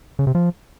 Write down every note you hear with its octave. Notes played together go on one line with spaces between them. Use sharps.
C#3
C3
F3